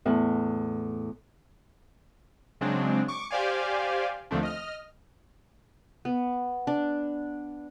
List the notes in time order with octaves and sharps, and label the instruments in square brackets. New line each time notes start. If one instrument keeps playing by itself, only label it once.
[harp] E2 A2
[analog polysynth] C#3 F#3 G#3 C4 D4
C#6 D6
G4 C5 D5 F5 G#5
D#2 D3 F3 A3 C4 D4
D#5 F6
[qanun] B3
D4